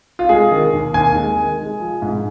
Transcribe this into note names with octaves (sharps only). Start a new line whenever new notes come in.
F4
G#3 G#4
D#3
D#2
D#2 G#5
G#3
D#3
G#3
F3
G#2